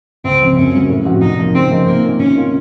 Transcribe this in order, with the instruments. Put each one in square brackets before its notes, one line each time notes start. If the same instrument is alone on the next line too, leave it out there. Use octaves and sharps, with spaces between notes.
[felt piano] C#2 [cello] C4
[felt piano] C#3 F3 C4
[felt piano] F#2 [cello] C#4
[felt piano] C#3 F#3 A#3
A2
F3 C4 F#4
[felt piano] C2 [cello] D#4
[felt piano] C3 F3 A#3
[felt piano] C#3 [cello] C4
[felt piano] F3 A#3 D#4
[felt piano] C3 [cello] A#3
[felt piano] D#3 A#3 C#4 F4
[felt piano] C3 [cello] C#4
[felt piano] D#3 A#3 F4